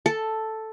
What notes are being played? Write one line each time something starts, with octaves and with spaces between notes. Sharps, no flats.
A4